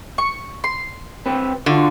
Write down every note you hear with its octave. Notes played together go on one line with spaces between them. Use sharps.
C#6
C6
C4 G4 B4
D3 F4 F#4